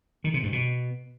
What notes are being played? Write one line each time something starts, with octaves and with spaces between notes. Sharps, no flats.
D#3
C3
G2
B2